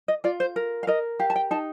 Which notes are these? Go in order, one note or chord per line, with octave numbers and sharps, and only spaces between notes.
D#5
F4 D5
C5
A#4
F5
A#4 D#5
G4 F5
A5
G5
D#4 A5